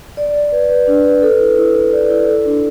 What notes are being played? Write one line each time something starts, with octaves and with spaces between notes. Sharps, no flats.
D5
D5
B4
B4
D4
B4
A4
E4
E4
E4
D5
E4
A4
D4